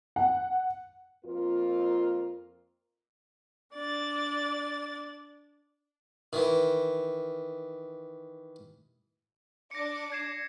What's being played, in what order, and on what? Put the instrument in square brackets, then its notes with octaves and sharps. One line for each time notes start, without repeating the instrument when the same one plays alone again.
[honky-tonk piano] F#5
[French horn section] F2 A#3 F4 A#4
[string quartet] D4 D5 A6
[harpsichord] D#3 E3
[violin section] D4 D6 [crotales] A#6 C#7
[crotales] G#6 C7 E7